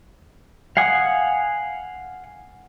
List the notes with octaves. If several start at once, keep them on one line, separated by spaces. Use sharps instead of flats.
F5 F#5 G#5 D#6